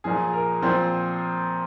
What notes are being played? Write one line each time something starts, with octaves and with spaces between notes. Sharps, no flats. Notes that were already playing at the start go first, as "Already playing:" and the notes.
A#2 F3 G#4
A#4
A#2 F3 C4 C5